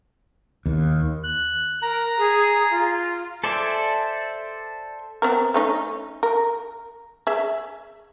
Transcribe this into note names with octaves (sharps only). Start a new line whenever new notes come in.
D#2
F#6
A#4 A#5
G#4
F4
A4 C5 D5 E5 G#5
B3 C4 A#4
A3 C#4 D#4
A#4
G#4 E5